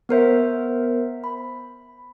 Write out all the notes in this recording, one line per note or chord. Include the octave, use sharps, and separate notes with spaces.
B3 A#4 C5 E5
B5